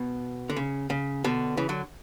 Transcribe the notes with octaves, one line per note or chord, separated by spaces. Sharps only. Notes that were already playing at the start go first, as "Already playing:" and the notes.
Already playing: B2
D3
C#3
C#3
B2 D3
C#3 E3
D3 F#3